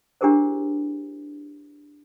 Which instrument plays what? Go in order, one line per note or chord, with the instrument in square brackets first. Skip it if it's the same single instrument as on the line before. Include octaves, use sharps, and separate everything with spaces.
[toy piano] D4 E4 G4 G#4 A#4 C5